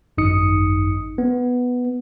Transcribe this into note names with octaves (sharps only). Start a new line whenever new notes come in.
G#1 F#2 D#4 D#6 C#7
B3